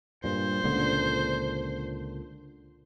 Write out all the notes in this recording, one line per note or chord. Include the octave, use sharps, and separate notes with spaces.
G2 A#2 C5
C#2 A#2 D3